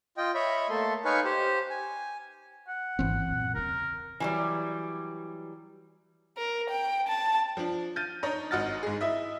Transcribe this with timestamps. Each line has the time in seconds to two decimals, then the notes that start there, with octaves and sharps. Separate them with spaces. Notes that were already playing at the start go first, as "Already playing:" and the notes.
0.17 F4 D#5 G5
0.35 C#5 D#5 E5 B5
0.70 A3 A#3 A4 C6
1.05 D#4 B4 C#5 F5 G#5 C#6
1.25 G4 C5
1.70 G#5
2.68 F#5
2.99 G#1 F#2 E3 C4
3.27 F#2 A#2
3.55 E2 C#3 A#4
4.20 E3 F#3 G3
6.37 A#4
6.69 G5
7.08 A5
7.57 F3 D4
7.96 F6 G6 A6 D#7
8.23 D4 D#4 C#5 D#5 A#5
8.51 G#1 F#4 D#5 F#5 F6 A6
8.83 G#2 G#4
9.01 E4 D#5 E5